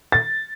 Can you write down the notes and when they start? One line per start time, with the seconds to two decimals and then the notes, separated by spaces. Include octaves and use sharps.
0.12 A6